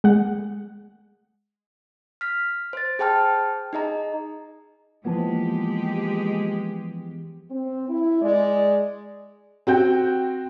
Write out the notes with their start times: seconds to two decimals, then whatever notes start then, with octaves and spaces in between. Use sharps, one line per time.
0.04 G#3 F#5
2.21 F6 B6
2.73 C5 A6
2.99 G#4 C5 G5 A5 F6
3.73 D#4 G#4 D#5 A#5
5.05 E3 F3 G#3 A#3 B3 F4 G4 A5
7.51 C4
7.89 E4
8.22 G#3 D5
9.67 C4 F#4 G5 G6